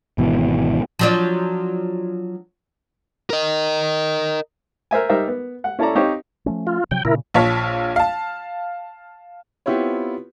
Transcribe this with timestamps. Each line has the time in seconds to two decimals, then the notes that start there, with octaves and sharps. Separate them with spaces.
0.18 G#1 B2 E3
0.99 F3 F#3 D4
3.30 A#4 D#5
4.91 A#4 C5 E5 G#5
5.09 G3 D#4 A#4 C5 E5
5.28 B3
5.64 F#5
5.79 C#4 E4 A4 C#5 D5 A#5
5.95 C4 D#4 G4 C5 C#5 F5
6.46 F3 A3 C#4
6.67 F4
6.91 C3 F3 F#3 G5
7.05 A#2 C#3 E4 A#4
7.34 A#1 F4 C#5 A5 B6
7.96 F5 A5
9.66 B3 C4 E4 F4 G4 C#5